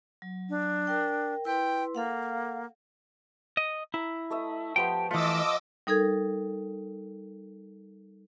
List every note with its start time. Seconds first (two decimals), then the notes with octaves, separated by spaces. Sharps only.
0.22 F#3
0.49 D4
0.87 A#4 G5
1.45 E4 B4 G5 C6
1.95 A#3 A4 F5 F#5
3.57 D#5
3.94 E4 A#5
4.30 A3 D#5 E5
4.76 F3 B3 G4 C5 G5
5.11 E3 A3 F4 D#5 A5 D6 E6
5.87 G3 D#4 A4 A#4 G#6